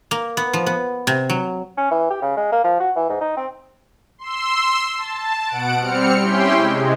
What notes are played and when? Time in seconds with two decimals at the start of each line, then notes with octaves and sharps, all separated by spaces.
0.11 A#3
0.37 B3
0.53 F3
0.66 B3
1.07 C3
1.30 F#3
1.77 C#4
1.91 E3
2.10 G4
2.22 C#3
2.37 G#3
2.52 A#3
2.64 F3
2.80 F#4
2.96 E3
3.09 G#2
3.21 D#4
3.37 C4
4.18 C6 E6
4.97 A5
5.47 B2 F#5 D7
5.80 G3 C4 F6 C#7
6.21 C#4 E4 G4 G5 C6
6.56 C3 G#3